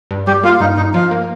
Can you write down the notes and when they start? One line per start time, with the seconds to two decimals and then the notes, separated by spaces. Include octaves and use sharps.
0.11 G2
0.27 G3 G4
0.43 A#3 F4
0.60 G2 D#4
0.77 G2 D#4
0.94 F3 F4
1.11 A#3